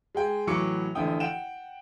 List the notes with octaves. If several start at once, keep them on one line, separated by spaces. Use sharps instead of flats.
G#3 G#4 G5
A2 E3 F#3 C#6 D6 C#7
A1 D3 F3 E4 G5 D#6
F#5 G5 D7 E7